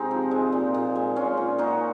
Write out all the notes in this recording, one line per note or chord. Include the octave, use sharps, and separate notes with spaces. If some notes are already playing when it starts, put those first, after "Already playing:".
Already playing: C3 G#3 C4 D#4
F3
G#3
A#2
A#2
G#3
G#3 C#4 F4
A#2
A#2 D#4 F#4